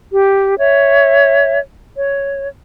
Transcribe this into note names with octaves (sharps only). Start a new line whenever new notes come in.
G4
C#5 E5
C#5